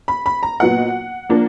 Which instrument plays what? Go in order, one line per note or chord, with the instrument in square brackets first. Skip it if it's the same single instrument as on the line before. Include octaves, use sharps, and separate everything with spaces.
[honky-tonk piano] B5
B5
A#5
A#2 F#3 B3 D#4 F#5
F3 A#3 D4